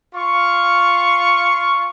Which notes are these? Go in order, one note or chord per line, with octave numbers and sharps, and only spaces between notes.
F4 F5 C#6